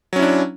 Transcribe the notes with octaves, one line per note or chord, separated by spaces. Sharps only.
F#3 C#4 D4 E4